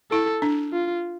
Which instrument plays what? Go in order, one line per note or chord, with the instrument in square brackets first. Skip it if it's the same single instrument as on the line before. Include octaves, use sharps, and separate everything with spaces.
[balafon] E4 [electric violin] A4
[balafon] D4
[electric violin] F4